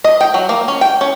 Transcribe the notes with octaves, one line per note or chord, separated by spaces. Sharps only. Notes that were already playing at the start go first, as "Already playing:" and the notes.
D#5
G5
F#3
A#3
C#4
G5
C#4